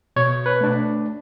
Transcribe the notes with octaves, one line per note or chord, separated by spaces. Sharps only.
B2 C#5
B4
A3 D4